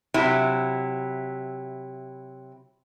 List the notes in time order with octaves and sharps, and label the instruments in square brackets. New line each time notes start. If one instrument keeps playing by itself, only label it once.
[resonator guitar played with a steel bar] C3 F#3 E4